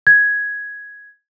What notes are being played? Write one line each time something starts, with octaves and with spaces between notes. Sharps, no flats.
G#6